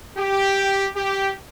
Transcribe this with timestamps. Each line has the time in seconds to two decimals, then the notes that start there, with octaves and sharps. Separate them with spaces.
0.16 G4
0.94 G4